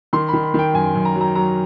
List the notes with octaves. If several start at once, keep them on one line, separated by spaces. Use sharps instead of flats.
D#3 C6
D#3 B5
B5
D#3 G5
F#2 G#5
F#2
A#5
F#3
A#5
F#3 A#5